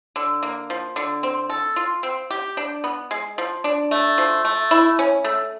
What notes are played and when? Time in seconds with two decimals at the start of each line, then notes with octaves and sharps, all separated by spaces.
0.16 D3
0.43 A#3
0.70 F3
0.96 D3
1.23 C4
1.50 A4
1.76 F4
2.03 C4
2.31 G4
2.57 D4
2.84 B3
3.11 G#3
3.38 F3
3.64 D4
3.91 A3
4.18 F3
4.45 A3
4.71 E4
4.99 C#4
5.24 A3